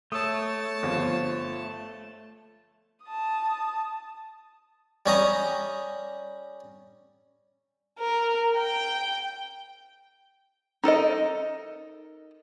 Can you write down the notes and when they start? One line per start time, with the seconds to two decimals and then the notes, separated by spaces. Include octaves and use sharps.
0.12 A3 C#5 A5 D#6 E6
0.83 G1 F3 F4
3.06 A5 D#6
5.06 G3 C#4 D#5 A#5
7.99 A#4
8.56 G5
10.84 D#4 A4 A#4 D#5